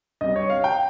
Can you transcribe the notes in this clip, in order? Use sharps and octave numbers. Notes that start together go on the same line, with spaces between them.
G2 G3 C4 D#5
C#5
F5
G5